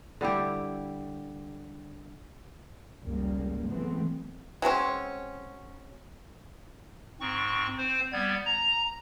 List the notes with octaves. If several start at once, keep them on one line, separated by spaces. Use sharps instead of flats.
D3 G3 E4 G4
F1 C#2 G#2 C#3 G3 A#3
E3 F#3 G#3 A3 B3 C4
F#3 G#3 C4 C#4
G#2 C4 C#6
C4 C5
G3 B3 G#6
A#5